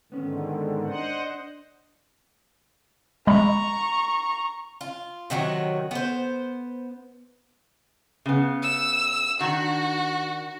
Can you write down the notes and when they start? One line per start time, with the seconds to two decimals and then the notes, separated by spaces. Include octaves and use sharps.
0.12 G#2 D3 D#3 B3 C#4
0.86 D4 C5 D#5 F#5
3.27 G#3 A#5 B5 C#6
4.81 F4
5.30 C3 D#3 F#3 F#4
5.91 B3 C5
8.26 C#3 B3
8.62 E6
9.41 D#3 D4 F#4